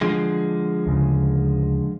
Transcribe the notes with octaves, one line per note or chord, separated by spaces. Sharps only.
D3 F3 G#3
D2 C#3